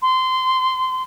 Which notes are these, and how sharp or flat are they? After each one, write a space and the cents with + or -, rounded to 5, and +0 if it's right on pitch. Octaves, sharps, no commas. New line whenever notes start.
C6 -20